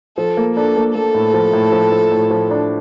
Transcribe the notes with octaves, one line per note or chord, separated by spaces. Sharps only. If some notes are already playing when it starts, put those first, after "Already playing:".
F3 A4
A#3
D4 A4
A#3
A#3 A4
A2
F3
A2
F3
F3
A2
F3
D4